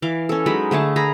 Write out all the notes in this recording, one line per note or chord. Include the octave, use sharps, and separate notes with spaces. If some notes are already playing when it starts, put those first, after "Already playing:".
E3 F5 D6
C#4 A4
F#3 G#3 D#4 B5
D3 A3 G#4 A5
G#4 A#4 A#5 B5